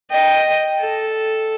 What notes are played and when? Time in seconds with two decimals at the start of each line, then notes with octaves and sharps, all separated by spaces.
0.10 D#5 G5
0.79 A4